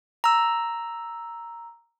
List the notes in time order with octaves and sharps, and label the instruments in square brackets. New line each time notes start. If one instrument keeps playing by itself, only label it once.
[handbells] A#5 E6